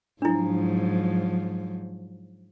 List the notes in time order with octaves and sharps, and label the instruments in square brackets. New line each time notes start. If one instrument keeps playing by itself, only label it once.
[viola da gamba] G#2 F3 F#3 [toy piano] D4 E4